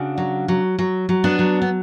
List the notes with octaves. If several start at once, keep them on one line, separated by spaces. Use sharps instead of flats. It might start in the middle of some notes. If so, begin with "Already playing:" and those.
Already playing: C#3 D4 F#4
F#3
F#3
F#3
F#3
B3 D4
F#3
B3